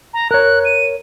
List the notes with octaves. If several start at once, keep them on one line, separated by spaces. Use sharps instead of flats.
A#5
A#4 C#5 F#6
D#7